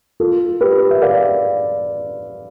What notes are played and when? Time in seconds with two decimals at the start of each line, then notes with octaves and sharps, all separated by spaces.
0.20 F4 A4
0.61 G4 B4
0.91 E5
1.02 D5 F5